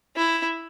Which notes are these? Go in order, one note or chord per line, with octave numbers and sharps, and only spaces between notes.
E4